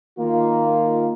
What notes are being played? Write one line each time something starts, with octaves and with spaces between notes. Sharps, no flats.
D#3 A#3 F4